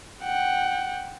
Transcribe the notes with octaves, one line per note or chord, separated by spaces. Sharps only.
F#5 G5